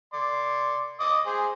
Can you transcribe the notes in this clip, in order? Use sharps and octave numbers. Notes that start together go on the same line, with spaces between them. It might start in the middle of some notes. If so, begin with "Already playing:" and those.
D5 C6
D#5 D6 D#6
G#4 C5